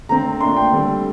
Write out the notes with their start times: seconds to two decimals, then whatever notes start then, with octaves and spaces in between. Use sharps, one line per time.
0.09 D3 A3 C4 A#5
0.40 A#2 A3 D4 C6
0.57 G5
0.72 D3 G3 C4